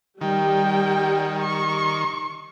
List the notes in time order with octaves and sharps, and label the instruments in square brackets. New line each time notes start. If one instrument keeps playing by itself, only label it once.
[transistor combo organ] D#3 [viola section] G3 [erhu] G5
[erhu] C#6